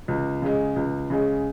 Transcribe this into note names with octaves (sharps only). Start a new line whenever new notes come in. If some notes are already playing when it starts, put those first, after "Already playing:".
C#2
C#3 G#3
C#2
C#3 G#3